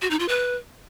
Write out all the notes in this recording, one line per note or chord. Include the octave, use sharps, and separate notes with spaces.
F#4
D#4
F4
B4